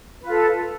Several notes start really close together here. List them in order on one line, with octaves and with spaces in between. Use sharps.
B4 F4 A4